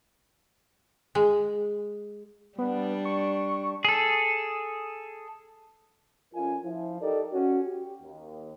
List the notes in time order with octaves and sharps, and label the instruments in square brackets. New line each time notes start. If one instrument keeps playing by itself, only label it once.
[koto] G#3
[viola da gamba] G3 D4 [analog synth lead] B3
[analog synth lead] C#6
[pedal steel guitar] G#4 A4
[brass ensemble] F2 C#4 F4 A#4 G#5
F3 E4
D#4 G4 A4 A#4 D5
C#4 F#4
G4
D#2